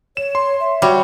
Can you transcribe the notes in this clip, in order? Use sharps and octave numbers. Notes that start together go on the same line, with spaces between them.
C#5 E7
C6
E5
G3 F#4 C#5